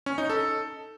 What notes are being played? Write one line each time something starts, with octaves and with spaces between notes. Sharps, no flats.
C#4
D#4
A4